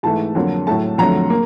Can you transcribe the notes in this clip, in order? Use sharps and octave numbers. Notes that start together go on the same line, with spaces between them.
G#2 E3 A3 A5
F2 D3 F#3 A#3
A2 F#3 A3 A5
F2 D3 F#3 A3 A#5
A#3